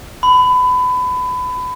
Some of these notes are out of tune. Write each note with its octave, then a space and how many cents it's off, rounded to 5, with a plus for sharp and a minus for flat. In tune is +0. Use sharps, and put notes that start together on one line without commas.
B5 +25